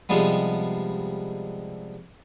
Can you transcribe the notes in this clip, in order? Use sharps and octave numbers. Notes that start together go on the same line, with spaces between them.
C3 F3 G3 G#3 B3